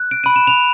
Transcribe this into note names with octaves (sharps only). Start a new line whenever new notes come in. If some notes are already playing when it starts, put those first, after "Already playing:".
Already playing: F#6
D7
B5 D#7
E7
F7